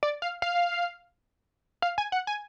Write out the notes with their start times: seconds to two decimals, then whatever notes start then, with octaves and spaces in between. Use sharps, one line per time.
0.03 D5
0.22 F5
0.42 F5
1.82 F5
1.98 G#5
2.12 F#5
2.27 G#5